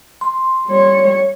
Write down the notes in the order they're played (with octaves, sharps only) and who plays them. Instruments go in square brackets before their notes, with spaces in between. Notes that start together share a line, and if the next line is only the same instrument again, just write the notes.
[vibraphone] C6
[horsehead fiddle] G3 C#5